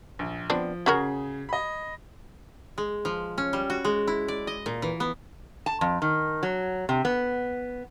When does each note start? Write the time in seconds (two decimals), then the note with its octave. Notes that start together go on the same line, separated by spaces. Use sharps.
0.19 A#1
0.50 F3 B3 C4 D4
0.86 C#3 C#4 F#4 G#4 A#4 G#6
1.49 D#5 B5
2.78 G#3
3.05 F3
3.38 C#4
3.53 G3
3.70 F#4
3.85 G#3
4.07 E4
4.28 D5
4.47 D#5
4.66 A#2
4.82 E3
5.00 B3
5.66 A5
5.81 F2
6.02 D#3
6.43 F#3
6.89 C3
7.05 B3